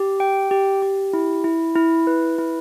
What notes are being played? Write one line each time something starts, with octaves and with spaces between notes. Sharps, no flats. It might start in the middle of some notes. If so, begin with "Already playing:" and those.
Already playing: G4
G5
G4
G4
E4
E4
E4
B4
E4